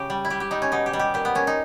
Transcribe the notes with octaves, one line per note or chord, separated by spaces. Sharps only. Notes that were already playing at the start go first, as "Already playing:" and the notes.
Already playing: C#3 G4
G3
E4
G3 G4
G4
G3 D#4
C#4
B2 D#4
G4
G3
G4
A#2 G4
B3
A#2 C#4
D#4